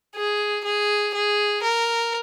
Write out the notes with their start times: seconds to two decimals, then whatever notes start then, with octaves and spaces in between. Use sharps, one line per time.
0.16 G#4
0.65 G#4
1.15 G#4
1.63 A#4